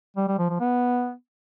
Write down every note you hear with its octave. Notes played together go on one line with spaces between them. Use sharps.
G3
G3
F3
F3
B3